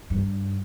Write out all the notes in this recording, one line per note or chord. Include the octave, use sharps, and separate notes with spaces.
G2